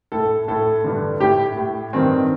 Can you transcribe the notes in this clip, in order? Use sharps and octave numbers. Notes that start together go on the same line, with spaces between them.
A2 A4
A2 A4
G2 D3
A2 G4
A2
G2 D#3 C4